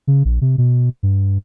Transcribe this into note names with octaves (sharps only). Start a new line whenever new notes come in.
C#3
A#1
C3
B2
G2